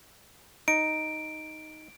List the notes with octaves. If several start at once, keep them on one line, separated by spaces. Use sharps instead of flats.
D#4 D7